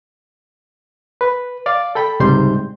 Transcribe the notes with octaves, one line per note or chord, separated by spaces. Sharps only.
B4
D5 F5
A4 G5 B5
C#2 G#2 C3 G3 C6 G6